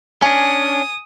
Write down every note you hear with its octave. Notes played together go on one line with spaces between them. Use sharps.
C#4 D4 G#5 D#6